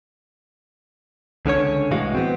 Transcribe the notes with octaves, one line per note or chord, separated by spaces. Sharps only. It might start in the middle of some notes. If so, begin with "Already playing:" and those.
C#2 D3 C#4 C#5
C2 A2 E3 G#3 F#4 F5
B3 C4